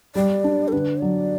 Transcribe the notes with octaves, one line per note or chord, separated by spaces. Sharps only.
G3 D5
D4
A4
D3 B4
F#3 D5